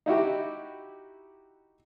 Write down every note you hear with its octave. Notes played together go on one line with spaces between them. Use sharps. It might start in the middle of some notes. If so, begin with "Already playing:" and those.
D#4 E4 F#4 G4